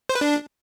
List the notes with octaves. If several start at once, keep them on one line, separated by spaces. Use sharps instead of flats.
C5
B4
D4